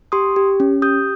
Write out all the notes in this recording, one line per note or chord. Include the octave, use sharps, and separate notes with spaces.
G4 C6 D#6
G4
C#4
G4 D#6 G6